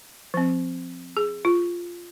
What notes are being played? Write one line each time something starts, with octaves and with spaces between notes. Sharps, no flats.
F3 C4
G#4
F4